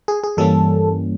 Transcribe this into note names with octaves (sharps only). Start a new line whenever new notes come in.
G#4
G#4
G2 E3 G3 A#3 C#4 A4